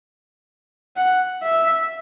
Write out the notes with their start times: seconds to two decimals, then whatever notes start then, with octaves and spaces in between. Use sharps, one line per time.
0.96 F#5
1.43 E5